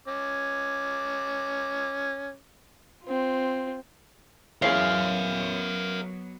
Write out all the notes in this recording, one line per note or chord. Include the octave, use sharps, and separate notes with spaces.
C#4 D6
C4 F4
E3 F#3 B3 C#4 G#4 A#4 E5 F5